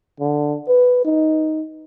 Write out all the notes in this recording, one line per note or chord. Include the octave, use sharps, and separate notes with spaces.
D3
B4
D#4